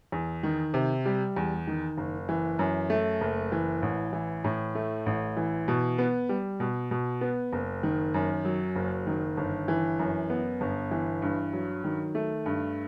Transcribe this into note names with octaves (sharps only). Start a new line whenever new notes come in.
E2
D#3
C3
G3
E2
D#3
F#1
E3
F#2
A3
F#1
E3
A1
E3
A2
A3
A1
E3
B2
B3
G3
B2
B2
B3
F#1
D#3
F#2
F#3
F#1
D#3
G1
E3
F#2
B3
G1
E3
G2
F#3
D#3
A3
G2